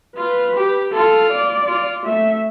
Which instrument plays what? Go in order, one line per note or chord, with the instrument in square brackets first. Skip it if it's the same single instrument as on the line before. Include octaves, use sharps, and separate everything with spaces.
[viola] F4 [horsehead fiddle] B4
[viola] G4
[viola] F4 [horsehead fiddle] A4
[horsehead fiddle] D5
[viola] F4
[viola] A3 [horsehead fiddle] E5